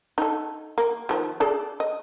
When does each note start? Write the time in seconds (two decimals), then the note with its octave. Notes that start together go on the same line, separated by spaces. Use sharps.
0.18 D#4 A4
0.78 A#3
1.09 D#3 F3 G3
1.40 G#4 A4 D5
1.80 D#5